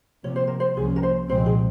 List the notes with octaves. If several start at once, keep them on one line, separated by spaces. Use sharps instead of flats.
C3 F3 A#3 C#5
C5
A#4
C5
C2 C3 F3 A#3 C#4 G#4
A#4
C5
C2 A#2 F3 G#3 C4 C5
G#4